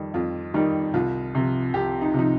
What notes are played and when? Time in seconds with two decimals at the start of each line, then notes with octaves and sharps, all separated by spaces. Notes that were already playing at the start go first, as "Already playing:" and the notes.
Already playing: F2 D#3 G3
0.14 F2 F4
0.54 D#3 G3 D#4
0.94 C2 F4
1.35 C3 F3
1.74 C2 G4
2.02 D#4
2.14 C3 F3 D#4